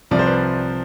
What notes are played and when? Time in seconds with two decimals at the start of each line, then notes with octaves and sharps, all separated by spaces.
0.11 C2 C3 F3 D5
0.19 C5
0.26 B4 D5